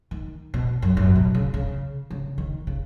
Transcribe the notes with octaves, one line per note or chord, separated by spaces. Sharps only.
D#3
B2
F#2
F#2
B2
C#3
C#3
C#3
D#3
C#3